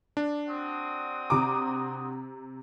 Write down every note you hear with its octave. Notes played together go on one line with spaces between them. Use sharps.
D4
C4 F#4 D#6
C3 A#5 D6